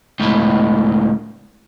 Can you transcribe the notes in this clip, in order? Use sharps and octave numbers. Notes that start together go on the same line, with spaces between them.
C#2 A2